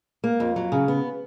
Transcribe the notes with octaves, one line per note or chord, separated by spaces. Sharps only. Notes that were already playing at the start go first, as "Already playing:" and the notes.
A#3
F2
F#3
C#3
B3